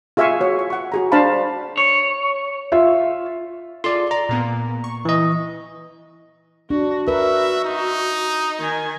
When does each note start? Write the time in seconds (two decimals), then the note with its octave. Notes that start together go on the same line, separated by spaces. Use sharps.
0.17 F4 G#4 E5 F5 G#5 C#6
0.40 F#4 C#5
0.59 C#6
0.70 F#5 C#6
0.92 F#4 G#4 A#5
1.12 D4 C5 F5 A5 B5
1.78 C#5
2.72 F4 E5
3.84 F4 G#4 A4 D5 C6
4.11 D5 A#5
4.29 A#2 A#3 B3
4.84 C#6
5.05 E3 D#5
6.70 D4 F#4
7.08 F#4 A#4 B4 E5
7.65 D#4
8.60 D#3 G#5